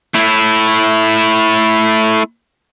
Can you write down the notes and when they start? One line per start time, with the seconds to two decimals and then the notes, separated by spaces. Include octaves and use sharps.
0.14 A3 E4